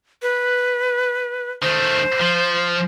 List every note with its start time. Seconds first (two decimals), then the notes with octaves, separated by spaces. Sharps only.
0.22 B4
1.62 D#3 A3 C5
2.20 F3